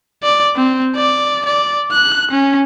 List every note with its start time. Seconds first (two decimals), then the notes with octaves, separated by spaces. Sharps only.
0.23 D5
0.56 C4
0.96 D5
1.45 D5
1.92 F#6
2.31 C#4